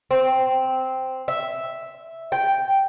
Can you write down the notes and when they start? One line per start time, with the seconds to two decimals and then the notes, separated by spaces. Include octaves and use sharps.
0.11 C4
1.28 E5
2.32 G5